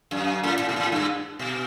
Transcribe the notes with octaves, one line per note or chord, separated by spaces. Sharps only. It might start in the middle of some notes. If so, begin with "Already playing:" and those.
F#2
A2
A2
B2
A2
G2
B2